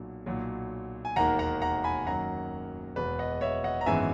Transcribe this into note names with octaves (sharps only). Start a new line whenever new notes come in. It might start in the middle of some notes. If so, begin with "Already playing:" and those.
Already playing: B1 A#2 F#3
B1 A#2 F#3
G#5
E1 D#2 D#3 A#3 F#5 A#5
F#5 A#5
F#5 A#5
G#5 B5
F#2 D#3 F#3 A#3 F#5 A#5
E1 E2 B2 B4
D#5 F#5
C#5 E5
D#5 F#5
A#5
G#1 F#2 E3 G#3 B3 E5 G#5